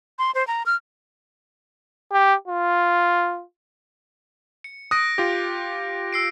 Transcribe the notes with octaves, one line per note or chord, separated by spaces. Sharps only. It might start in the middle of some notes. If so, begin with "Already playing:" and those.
C6
C5
A#5
F6
G4
F4
C#7
D#6 F#6 A#6 D7
F4 G4
E6 C7 D7